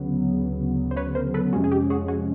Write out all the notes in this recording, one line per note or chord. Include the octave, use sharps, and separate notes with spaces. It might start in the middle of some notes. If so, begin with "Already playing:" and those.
Already playing: D2 C#3 F#3 B3
C5
B4 C#5
A#4 C5
A4 B4
F2 C3 F3 G#3 C#4 F#4
G#4
G4
F#4 G#4
F#4 G#4